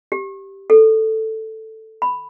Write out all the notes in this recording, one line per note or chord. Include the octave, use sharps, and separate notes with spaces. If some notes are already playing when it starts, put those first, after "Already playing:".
G4
A4
B5